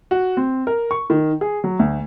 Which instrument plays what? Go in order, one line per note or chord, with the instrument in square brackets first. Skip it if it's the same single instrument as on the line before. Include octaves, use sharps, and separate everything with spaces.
[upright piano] F#4
C4
A#4
C#6
D#3
G#4
F#3
D2